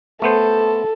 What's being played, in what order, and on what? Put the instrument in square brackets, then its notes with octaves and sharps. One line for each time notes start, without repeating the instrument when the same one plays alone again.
[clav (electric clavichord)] A3 B3 C5 [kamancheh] A4